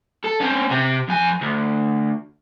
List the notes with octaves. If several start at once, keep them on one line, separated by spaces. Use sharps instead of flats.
A4
C4 C#4
C3 G4
F2 G#5
D2